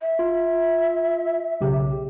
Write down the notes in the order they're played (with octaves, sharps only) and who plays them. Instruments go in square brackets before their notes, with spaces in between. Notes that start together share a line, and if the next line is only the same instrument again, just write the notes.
[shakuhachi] E5
[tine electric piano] F4
B1 C#3 G4